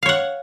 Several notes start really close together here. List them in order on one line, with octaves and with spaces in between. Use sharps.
F5 C#5 F#5